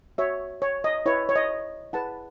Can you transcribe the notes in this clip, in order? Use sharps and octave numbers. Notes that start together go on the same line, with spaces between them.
F#4 C#5 E5
C#5
D#5
E4 B4 C#5
C#5
D#5
E4 G#4 B4 F#5 A5